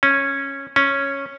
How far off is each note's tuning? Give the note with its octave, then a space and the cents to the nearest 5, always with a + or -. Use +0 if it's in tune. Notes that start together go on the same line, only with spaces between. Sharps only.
C#4 -10
C#4 -5